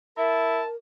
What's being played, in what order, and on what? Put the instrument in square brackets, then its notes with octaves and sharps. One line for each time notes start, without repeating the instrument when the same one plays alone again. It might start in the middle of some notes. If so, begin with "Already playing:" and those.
[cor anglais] E4 [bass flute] A#4 [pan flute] E5 [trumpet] A5